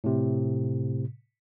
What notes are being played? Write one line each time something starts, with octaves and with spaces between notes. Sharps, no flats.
A2 C3